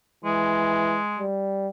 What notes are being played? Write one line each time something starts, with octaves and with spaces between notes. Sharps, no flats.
E3 G#3
G3